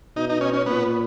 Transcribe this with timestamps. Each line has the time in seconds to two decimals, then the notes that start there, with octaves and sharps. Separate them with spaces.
0.16 B2 D#4
0.30 D#4
0.41 C#4
0.54 C#4
0.66 A#2 B3